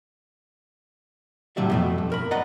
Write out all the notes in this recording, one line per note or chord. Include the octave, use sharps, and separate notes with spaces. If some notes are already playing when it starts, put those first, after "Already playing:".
A2 C3 F#3 G3 D5 E5
F2 B2 A3
G2
A#4 B5
B4 D5 D#5 F#5 A#5